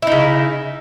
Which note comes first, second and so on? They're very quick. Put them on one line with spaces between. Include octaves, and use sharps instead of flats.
E4 D#4 C#3